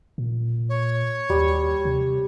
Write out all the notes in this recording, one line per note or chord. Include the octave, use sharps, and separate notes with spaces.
A#2
C#5
D#2 G3
C3